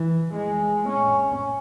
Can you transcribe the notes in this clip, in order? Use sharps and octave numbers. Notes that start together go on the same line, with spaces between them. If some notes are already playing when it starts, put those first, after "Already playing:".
Already playing: E3
G#3
C#4